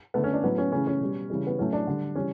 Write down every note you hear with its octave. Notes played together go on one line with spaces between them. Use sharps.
D3 A3 B3
C#4
D4
A2 F#3 A3 B3
C#4
C#3 E3 A3 C#4
C#4
B2 G3
C#3 E3 G3
B3
A2 F#3 A3 C#4
D4
D3 G3
C#3 E3 G3 C#4